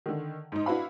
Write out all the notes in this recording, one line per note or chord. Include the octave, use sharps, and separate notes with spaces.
D3 D#3
G#2 D#4
D4 E4 F#4 B4 F5 B5